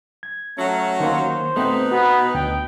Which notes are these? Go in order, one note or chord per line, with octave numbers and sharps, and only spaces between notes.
G#6
F#3 A3 C#4
D#3 A#3 C5
B2 A3 B3 C4 D#4 B4
B3 F#4
D2 G5